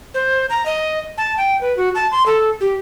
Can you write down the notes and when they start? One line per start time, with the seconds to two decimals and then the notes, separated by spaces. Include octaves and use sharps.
0.14 C5
0.50 A#5
0.66 D#5
1.18 A5
1.37 G5
1.61 B4
1.77 F#4
1.95 A5
2.11 C6
2.26 A4
2.61 G4